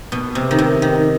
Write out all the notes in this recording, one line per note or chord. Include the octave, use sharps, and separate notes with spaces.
B2
C3
D#3
C3
D#3